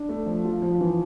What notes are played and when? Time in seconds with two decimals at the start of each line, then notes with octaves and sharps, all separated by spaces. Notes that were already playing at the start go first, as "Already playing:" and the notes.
Already playing: D4
0.09 A3
0.26 F3
0.45 F4
0.62 F3
0.81 E3